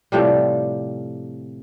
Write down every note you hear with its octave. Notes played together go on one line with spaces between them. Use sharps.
A2 C3 F3 G3